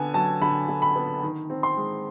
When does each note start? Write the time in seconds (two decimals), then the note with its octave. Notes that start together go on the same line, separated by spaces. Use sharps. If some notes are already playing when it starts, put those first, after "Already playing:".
Already playing: D3 B3 G#5
0.14 F#3 A5
0.41 D3 B5
0.68 D3
0.82 B5
0.96 B3
1.23 D#3
1.50 C4
1.63 C6
1.77 G#3